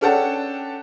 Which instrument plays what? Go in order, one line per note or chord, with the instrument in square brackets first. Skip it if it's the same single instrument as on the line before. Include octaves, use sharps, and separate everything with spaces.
[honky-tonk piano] C#4 D4 A4 F#5 G5 A5